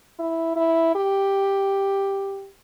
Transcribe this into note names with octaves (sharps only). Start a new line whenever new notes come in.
E4
E4
G4